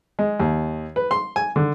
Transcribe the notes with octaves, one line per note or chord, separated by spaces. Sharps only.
G#3
D#2
B4
C6
G#5
D3